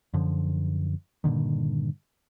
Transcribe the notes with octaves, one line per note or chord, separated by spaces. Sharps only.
F#2 D3 F3
G2 A#2 D3 D#3